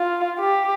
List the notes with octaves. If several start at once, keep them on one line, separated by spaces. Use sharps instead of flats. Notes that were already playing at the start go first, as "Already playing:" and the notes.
Already playing: F4
G4